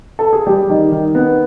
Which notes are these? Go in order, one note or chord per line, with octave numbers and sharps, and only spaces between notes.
A4
G#4
G3 G4
D#3
D#3
B3